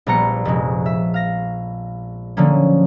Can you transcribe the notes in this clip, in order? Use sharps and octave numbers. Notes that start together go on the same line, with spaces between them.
A#1 G3 B3 A#5 C#7
F1 G#3
E5
F5 A#6
D3 F3 F#3 A#3 C#4